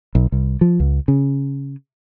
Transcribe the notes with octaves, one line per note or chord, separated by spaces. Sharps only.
B1
C2
F3
C#2
C#3